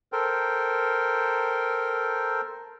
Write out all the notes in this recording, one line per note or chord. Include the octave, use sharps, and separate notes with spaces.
A4 A#4 C5 G5